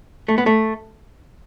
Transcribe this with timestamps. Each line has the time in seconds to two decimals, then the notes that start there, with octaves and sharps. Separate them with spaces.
0.28 A3
0.38 B3
0.46 A3